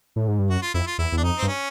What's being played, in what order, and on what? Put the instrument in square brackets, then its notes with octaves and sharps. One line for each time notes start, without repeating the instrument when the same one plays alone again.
[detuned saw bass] A2
G#2
G2
[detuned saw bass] F#2 [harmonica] F#4
[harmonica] F4
[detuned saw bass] F2 [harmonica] E4
[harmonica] F4
[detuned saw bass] E2 [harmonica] E4
[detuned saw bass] E2
[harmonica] D4
[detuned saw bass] F2 [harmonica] D#4
[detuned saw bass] G2 [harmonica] C4
[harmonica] C#4